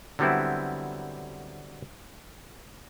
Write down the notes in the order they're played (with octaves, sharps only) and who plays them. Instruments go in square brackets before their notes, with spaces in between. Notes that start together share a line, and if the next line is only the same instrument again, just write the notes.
[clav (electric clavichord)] D3 F#3 G3 B3 C4 E4